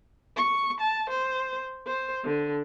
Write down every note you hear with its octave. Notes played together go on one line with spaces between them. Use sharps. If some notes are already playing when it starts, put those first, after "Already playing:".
C#6
A5
C5
C5
D3